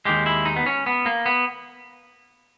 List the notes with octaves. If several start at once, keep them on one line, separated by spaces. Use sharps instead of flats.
D#2 D#3 G#3 G4
E4
D#4
B3
C#4
B3
A#3
B3